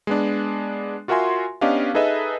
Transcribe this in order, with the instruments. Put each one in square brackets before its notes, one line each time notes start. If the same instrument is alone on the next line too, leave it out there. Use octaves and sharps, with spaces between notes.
[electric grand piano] G#3 B3 D4
F4 F#4 A#4 E5 G#5 C6
B3 C#4 D4 G4 D#5 F5
D#4 G#4 A4 B4 D#5 E5